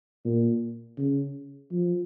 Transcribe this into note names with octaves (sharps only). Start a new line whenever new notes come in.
A#2
C#3
F3